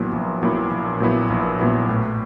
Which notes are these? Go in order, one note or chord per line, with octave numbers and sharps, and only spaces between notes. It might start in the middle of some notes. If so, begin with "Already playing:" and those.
Already playing: A#1 A#2 F#3 B3 E4
A#1
A#2 F#3 B3 E4
A#1
A#2 F#3 B3 E4
A#1
A#2 F#3 B3 E4
A2